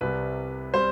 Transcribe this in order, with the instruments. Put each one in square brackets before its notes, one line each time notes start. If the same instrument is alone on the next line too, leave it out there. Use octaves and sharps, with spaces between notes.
[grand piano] C2 C3 G3 B4
C3 G3 C5